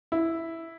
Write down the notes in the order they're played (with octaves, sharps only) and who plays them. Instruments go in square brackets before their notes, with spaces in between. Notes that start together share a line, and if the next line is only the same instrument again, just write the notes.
[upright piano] E4